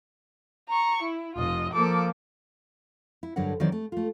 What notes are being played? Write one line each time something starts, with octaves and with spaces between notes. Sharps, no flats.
A#5 C#6
E4
F1 F4 D#5
F3 A#3 A4 D6
E4
G2 D3 F#3 A#4 F#5
D#3 E3 F#3 C4 C5 D5
A3
A3 F4